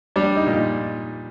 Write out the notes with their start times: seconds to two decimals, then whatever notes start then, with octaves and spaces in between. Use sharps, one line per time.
0.16 G3 D4
0.37 D#4
0.46 A#2